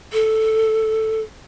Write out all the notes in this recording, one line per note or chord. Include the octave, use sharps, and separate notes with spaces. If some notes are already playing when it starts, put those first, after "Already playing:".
A4